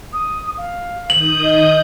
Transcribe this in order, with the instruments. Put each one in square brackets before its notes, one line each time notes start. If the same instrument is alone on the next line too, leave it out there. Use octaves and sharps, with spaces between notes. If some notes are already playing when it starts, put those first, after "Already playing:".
[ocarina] D#6
F5
[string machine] D#3 D#6 G6 [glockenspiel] F#7
[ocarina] D#5